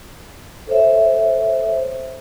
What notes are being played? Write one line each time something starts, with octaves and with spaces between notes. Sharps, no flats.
A4 C5 C#5 E5